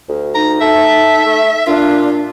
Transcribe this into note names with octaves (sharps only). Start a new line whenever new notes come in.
D2
D#4 A#5
A4 E5
A3
A#2 D4 F4